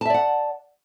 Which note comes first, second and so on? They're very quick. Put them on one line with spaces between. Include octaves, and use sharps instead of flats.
A5 E5 D5 F#5